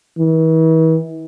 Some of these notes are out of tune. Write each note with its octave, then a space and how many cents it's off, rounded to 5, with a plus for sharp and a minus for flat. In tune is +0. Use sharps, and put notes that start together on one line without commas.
E3 -40